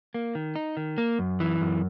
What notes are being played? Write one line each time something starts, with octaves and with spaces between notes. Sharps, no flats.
A#3
D#3
D#4
D#3
A#3
F#2
E3
F#2